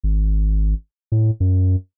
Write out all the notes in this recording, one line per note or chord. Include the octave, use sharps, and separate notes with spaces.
G#1
A2
F#2